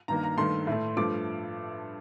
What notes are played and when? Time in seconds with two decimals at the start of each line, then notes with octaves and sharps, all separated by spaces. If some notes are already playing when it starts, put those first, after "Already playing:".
0.08 G2 D#3 A#3 A#5
0.23 A#5
0.37 G2 D#3 A3 C6
0.67 A2 A3
0.97 G2 F3 A3 D6